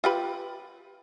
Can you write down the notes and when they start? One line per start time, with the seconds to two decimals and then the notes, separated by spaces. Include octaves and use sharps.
0.04 F4 G4 B4